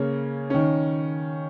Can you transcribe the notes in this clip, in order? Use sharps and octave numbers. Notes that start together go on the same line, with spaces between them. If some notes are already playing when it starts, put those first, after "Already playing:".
Already playing: C#3 A#3 C#4
D#3 C#4